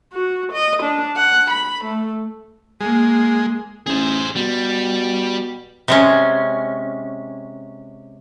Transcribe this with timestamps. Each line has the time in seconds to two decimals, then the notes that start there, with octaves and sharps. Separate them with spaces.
0.13 F#4
0.52 D#5
0.83 D4
1.17 F#5
1.51 B5
1.85 A3
2.81 G#3 A#3
3.87 A1 G#4 C5
4.36 B2 G3
5.88 C3 G#3 C#4